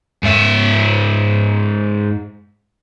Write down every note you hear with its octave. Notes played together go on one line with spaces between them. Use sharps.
G#2 E5